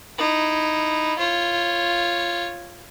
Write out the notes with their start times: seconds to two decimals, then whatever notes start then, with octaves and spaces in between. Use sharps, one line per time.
0.18 D#4 E4
1.18 F4 C#5